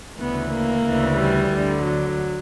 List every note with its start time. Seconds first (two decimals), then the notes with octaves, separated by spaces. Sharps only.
0.20 D2 C#3 E3 B3
0.53 A#3
0.85 D2 C#3 E3
1.18 G3
1.51 D2 D3
1.84 F#3